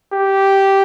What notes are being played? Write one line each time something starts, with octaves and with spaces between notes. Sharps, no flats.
G4